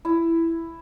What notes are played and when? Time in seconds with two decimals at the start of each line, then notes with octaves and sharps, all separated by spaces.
0.05 E4